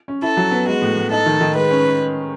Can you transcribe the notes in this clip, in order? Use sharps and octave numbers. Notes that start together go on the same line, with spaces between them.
C#4
E4 A4
F#3
B3
G#3 F#4
A2
A2
D#4 A4
D#3
D#3
G#3 B4
C#4